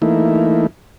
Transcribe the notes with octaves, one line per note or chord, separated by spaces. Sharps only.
E3 A3 A#3 D#4 E4